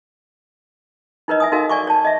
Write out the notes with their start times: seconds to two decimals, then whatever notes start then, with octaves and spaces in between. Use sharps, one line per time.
1.28 D#4 E4 A#4 B4 C#5 D#5
1.40 E5 G#5 D#6
1.52 D#4 F#4 A4 A#4 F5 G#5
1.69 D5 G#5 C#6 D6
1.87 C#5 A5
2.05 D#5 E5